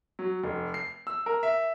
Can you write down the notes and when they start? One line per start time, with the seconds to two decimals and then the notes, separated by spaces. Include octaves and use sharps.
0.19 F#3
0.44 F1
0.74 C7
1.07 E6
1.26 A#4
1.43 E5